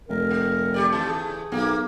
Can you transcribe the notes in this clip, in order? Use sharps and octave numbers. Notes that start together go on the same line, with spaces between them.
F1 A#4
A3
G3 G4 D5
C#3 E3 A3 A5
G#4
B1 A#3